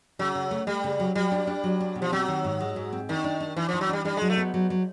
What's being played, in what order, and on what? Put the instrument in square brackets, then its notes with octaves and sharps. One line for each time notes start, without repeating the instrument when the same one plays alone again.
[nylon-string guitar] C#3 [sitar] F#3
[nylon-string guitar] C#3
A3
[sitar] G3 [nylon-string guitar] A3
[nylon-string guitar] C#3
F#3
[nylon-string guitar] F#3 [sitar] G3
[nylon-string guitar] D4
D4
F#3
D4
B2
[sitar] F3
[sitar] F#3 [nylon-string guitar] C4
[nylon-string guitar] D#3
G#2
G#3
G#2
C4
[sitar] D#3 [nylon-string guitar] D4
[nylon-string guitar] D4
D4
[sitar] E3 [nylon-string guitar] D4
[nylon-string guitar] E3 [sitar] F3
[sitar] F#3
[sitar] G3 [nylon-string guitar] D4
[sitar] G3 [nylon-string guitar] D4
[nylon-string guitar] F#3 [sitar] G#3
[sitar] A3
[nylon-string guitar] B3
F#3
F#3